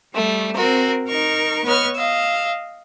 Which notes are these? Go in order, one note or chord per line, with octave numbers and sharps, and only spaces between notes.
G3 A3
C4 F#4 A#4
D#4 A#4 C#6
B3 B4 C#5 D#5 C#6 F6
D#5 F5 E6